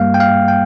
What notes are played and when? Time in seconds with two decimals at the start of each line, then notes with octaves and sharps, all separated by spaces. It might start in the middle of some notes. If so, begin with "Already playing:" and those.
Already playing: G2 G3 A#3 F5
0.14 G5
0.20 F5
0.48 G5